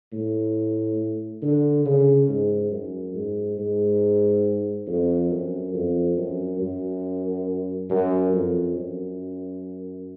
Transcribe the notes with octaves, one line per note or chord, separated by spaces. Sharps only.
A2
D3
C#3
G#2
F#2
G#2
G#2
F2
F#2
F2
F#2
F#2
F#2
F2
F#2